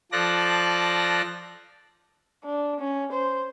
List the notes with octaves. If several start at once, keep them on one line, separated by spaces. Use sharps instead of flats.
F3 A4 D5 F#6 A#6
D4
C#4
C5